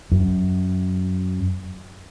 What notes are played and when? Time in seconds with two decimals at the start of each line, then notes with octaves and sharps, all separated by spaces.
0.12 F#2